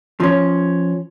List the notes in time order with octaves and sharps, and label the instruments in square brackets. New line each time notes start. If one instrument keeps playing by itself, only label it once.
[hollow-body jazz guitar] F3 C#4